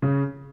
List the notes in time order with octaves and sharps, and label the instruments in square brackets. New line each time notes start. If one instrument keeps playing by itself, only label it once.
[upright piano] C#3